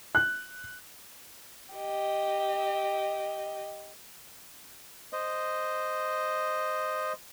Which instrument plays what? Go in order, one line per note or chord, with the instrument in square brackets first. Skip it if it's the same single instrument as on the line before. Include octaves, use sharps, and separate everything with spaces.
[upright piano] F#6
[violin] G4 D#5
[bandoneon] C5 D#5